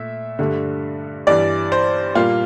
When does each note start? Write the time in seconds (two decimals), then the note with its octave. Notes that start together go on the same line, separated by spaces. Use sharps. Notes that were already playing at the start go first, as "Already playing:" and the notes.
Already playing: A#2 A3 E5
0.39 G2 D3 A3
1.27 G2 E3 G3 D5
1.72 C5
2.15 A#2 G3 A#3 F4